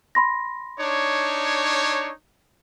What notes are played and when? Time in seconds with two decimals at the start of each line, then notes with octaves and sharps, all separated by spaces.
0.15 B5 C6 A#6
0.80 D4 D#4 C#5